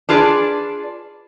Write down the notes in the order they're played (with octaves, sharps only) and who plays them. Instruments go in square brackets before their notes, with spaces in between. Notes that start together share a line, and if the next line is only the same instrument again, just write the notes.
[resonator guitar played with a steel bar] D4 F4 G#4 B4 D5